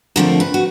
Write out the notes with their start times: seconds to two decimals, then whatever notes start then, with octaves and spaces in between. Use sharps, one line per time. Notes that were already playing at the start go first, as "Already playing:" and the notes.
0.16 D#2 D3 F3 A3 C4 A#4
0.40 B4
0.54 F#4